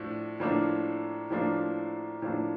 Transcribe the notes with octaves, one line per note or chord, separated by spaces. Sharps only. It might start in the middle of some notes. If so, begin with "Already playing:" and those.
Already playing: A2 F3 D4
A2 F3 A#3 D4
A2 F3 A#3 D4
A2 F3 A#3 D4